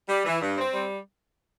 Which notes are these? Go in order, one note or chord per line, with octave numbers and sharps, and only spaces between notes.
G3
E3
G2
C4
G3